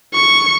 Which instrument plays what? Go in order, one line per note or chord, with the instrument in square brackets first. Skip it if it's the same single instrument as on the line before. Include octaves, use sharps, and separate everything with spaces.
[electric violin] C#6